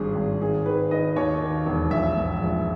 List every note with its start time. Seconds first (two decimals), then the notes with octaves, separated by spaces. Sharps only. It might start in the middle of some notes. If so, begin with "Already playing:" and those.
Already playing: G#1 G2 G#4
0.15 G#1
0.41 D#3 G#4
0.66 D#3 B4
0.91 D#3 D#5
1.16 D#2 C#5
1.41 D#3
1.66 E1
1.91 A#1 E5
2.17 G#2
2.41 A#1